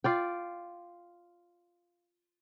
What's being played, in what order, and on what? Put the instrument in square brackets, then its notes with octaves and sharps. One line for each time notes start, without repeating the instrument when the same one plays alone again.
[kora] F4 D5 G5